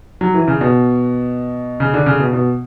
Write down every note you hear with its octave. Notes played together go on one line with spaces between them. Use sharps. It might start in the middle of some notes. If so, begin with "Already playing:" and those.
F#3
E3
C#3
B2
C#3
D3
C#3
B2
B2